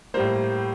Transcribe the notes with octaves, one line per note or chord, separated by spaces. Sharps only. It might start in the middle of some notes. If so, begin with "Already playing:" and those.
A2 G3 A#3 C5